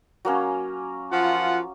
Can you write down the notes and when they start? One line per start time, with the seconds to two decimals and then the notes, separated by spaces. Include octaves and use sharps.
0.25 F#3 A#3 C#4
1.12 F3 F4 F#5